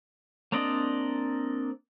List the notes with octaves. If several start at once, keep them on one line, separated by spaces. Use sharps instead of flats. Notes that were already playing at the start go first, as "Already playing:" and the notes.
A#3 C4 D4 D5 D#5